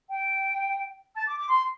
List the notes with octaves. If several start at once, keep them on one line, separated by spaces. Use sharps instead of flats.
G5
A5
D6
D6
C6